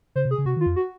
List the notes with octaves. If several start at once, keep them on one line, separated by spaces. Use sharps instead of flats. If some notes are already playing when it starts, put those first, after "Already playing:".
C#3 C5
C3
G#4
C#3
C3 F#4
D#3
F4
F2
F#4